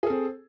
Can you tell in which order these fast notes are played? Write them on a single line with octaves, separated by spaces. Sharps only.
G#4 A4 C4